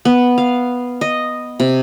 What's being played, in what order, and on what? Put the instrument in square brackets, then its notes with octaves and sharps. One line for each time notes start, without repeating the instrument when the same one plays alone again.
[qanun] B3
F5
D#5
C3